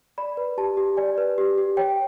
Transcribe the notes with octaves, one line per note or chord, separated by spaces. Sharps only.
D5 B5
B4
G4 A5
G4
D5 G#5
B4
G4
G4
C#5 G5